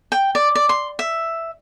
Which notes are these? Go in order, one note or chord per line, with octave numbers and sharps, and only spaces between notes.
G5
D5
D5
C6
E5